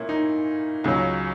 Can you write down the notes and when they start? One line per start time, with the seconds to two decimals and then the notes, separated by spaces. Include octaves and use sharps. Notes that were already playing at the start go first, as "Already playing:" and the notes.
Already playing: A#2 A#3 C#4 E4
0.09 D#4
0.84 C#2 C#3 F#3 C#4